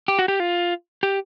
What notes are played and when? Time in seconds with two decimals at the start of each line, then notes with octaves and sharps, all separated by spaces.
0.08 G4
0.19 F#4
0.28 G4
0.40 F4
1.03 G4